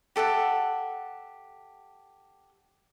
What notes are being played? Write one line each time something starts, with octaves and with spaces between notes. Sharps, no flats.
G4 A4 E5 F#5